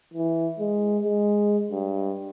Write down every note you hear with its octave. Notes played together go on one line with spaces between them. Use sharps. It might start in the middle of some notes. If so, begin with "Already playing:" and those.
E3
G#3
G#3
G2